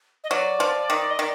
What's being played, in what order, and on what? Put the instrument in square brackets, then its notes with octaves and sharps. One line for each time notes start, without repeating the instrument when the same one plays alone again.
[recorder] D#5
[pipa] F#3 [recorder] D5
[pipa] F3
D#3
[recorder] D#5
[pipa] D#3 [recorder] D5